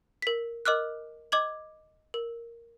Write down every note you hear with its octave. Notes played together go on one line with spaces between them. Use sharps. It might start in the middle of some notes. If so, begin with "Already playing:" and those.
A#4 B6
A#4 D#5 D6 F6 F#6
D#5 D6 G#6 F#7
A#4